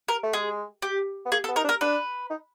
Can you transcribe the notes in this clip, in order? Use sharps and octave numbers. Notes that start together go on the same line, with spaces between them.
A#4
A3
G#3 G#4
G4
B3
A#3 G#4
A4
B3
D#4 A#4
D4
A#4
D4 B4
D#4